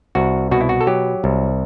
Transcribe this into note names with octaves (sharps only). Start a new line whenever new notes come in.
C2 F#4
B2 F#4
E4
F#4
A4
F#3 G4
C2